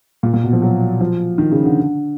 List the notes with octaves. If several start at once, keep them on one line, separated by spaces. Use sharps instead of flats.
A#2
A#2
B2
F3
F#3
F3
D#3
C#3
D3